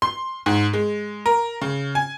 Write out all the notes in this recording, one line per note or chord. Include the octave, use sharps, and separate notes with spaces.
C6
G#2
G#3
A#4
C#3
G#5